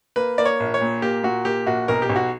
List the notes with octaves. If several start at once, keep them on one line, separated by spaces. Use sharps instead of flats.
A#3 B4
A#3 D5
C#5
A#1
C#5
A#2
A#3 G4
A#2 F#4
A#3 G4
A#1 F#4
B1 A#4
G4
B1
F#4